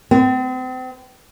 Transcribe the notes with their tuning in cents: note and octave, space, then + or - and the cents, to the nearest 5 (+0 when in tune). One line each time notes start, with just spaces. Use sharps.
C4 -35